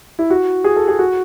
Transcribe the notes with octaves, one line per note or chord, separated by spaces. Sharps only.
E4
F#4
G#4
A4
G#4
F#4